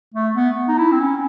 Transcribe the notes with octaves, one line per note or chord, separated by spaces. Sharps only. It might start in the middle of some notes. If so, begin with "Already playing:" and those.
A3
B3
D#4
E4
C4
C#4